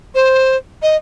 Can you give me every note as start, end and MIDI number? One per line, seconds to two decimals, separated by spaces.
0.15 0.57 72
0.82 0.97 75